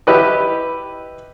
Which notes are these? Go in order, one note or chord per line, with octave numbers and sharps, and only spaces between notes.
E4 G4 B4 D#5